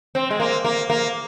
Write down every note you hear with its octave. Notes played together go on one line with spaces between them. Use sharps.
C4
G#3
A#3
A#3
A#3